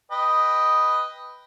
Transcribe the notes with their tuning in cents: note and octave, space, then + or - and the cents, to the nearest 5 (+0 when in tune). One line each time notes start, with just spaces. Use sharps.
B4 +0 D#5 +0 G5 +0